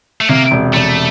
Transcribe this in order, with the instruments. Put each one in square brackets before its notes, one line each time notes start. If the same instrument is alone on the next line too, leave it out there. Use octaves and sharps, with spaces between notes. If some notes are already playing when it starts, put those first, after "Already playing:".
[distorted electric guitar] A3
[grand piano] C3 [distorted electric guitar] A#3
[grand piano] E1
[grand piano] E1 [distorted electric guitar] A3